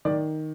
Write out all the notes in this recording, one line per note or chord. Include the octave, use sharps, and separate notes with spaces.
D#3 D5